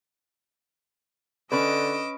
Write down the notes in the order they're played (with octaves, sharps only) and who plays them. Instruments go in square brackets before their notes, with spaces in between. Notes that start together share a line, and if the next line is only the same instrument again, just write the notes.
[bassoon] D3 [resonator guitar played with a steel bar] C#4 B4 [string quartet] D#5 D6 E6